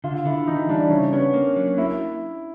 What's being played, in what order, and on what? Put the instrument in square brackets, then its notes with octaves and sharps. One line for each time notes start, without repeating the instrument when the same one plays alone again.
[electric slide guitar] D3 [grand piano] F4
[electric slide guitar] D3 [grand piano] E4
[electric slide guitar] E3 [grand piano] D#4
[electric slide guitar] G3 [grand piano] D4
[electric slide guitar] C#3 [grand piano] C#4
[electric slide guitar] B3 [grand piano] C#4
[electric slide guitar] A#3
F#3
[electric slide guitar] A#3 [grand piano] E4